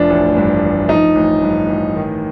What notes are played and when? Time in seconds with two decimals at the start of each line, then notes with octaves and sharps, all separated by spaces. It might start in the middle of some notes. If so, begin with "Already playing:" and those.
Already playing: F1 F3 D4
0.10 A1
0.37 G2
0.63 A1
0.89 F3 D#4
1.15 A1
1.42 G2
1.69 A1
1.96 D#3